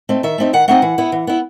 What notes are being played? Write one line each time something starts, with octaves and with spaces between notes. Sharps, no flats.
A3 C4 D#4
D#3 E5
A3 C4 D#4
D#3 F#5
A3 C4 D#4 F#5
E3
B3 E4
E3
B3 E4